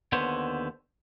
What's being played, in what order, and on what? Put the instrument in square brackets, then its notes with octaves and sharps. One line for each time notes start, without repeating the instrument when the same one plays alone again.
[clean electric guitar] D#2 D3 B3 C5 C#5